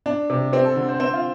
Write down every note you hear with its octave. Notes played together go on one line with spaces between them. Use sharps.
D4
C3
C4 G4
A4
D3
C5
C4 C5
F4